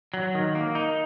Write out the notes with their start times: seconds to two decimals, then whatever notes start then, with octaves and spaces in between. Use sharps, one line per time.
0.14 F#3
0.35 D#3
0.55 A#3
0.75 D#4